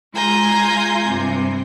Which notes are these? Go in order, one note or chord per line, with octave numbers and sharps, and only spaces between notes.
G#3 F4 G#5 A#5 G6
G2 C3